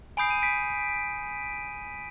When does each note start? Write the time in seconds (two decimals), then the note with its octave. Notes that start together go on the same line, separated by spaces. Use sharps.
0.17 G#5 B5 D#6 G6 C7 D7
0.30 D#7
0.42 B6 D7